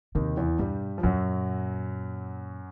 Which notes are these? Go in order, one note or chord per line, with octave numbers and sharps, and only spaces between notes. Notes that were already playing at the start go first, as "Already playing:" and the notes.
D#2 C3 D#3
E2 E3
G2 B2 G3
F3
F#2 A#2 F#3